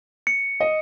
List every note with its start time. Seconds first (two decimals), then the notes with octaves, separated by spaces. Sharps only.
0.27 C#7
0.60 D#5